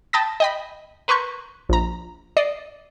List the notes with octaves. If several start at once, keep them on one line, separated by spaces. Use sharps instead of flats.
G5 A5 B5 D#6 A6 A#6
D#5 G5 B5
A#4 B4 C6 C#6 G6
A#1 A#5
D5 D#5 C7